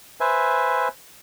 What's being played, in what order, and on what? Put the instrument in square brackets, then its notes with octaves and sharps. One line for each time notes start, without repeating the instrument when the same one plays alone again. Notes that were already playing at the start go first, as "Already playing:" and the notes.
[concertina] B4 C5 E5 G#5